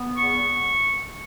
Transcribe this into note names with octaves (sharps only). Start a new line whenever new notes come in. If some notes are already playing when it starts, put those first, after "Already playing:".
Already playing: B3
E2 C#6